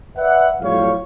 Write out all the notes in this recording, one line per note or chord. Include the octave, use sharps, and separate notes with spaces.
B4 D5 E5 F#5
F2 A2 F#3 G3 C#5 F5